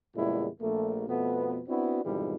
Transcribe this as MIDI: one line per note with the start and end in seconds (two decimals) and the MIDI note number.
0.16 0.49 40
0.16 0.49 46
0.16 0.49 49
0.16 0.49 55
0.16 0.49 56
0.16 0.49 64
0.60 1.05 34
0.60 1.05 57
0.60 1.05 58
1.08 1.62 41
1.08 1.62 47
1.08 1.62 57
1.08 1.62 59
1.68 2.03 59
1.68 2.03 60
1.68 2.03 62
1.68 2.03 64
1.68 2.03 66
2.04 2.36 41
2.04 2.36 44
2.04 2.36 47
2.04 2.36 51
2.04 2.36 52
2.04 2.36 55